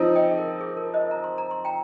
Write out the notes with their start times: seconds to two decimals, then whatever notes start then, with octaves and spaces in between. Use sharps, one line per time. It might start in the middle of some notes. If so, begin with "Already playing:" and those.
Already playing: F3 C4 D#4
0.16 D#5 G5
0.30 G#4
0.38 A#4
0.61 G#4
0.77 A#4
0.94 C5 D#5
1.11 A#5
1.24 C6
1.38 A#5
1.51 C6
1.65 G5 A#5